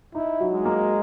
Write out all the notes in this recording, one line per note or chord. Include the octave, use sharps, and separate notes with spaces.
D#4 E4
F#3
G#3
A#3